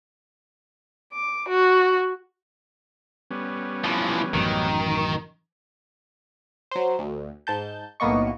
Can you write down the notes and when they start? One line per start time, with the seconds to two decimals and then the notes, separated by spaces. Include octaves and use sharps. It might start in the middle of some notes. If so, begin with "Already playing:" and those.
1.13 D6
1.49 F#4
3.31 G3 B3 C#4
3.84 E3 F3
4.34 A1 F#2 D#3
6.71 F#3 C5
6.99 D2
7.47 G#2 A5 G6
8.00 B1 A2 A#3 B3 D#5 C#6